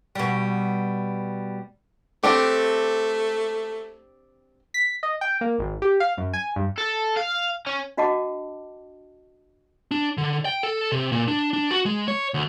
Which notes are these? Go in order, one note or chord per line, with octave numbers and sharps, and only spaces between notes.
B2 G3
A3 C4 D4 G4
B6
D#5
G5
A#3
G#1
G4
F5
F#2
G#5
G2
A4
F5
C#4
D4 F#4 D#5 F#5 A5 D6
D4
D3
G5
A4
C3
A#2
D4
D4
F#4
G#3
C#5
D2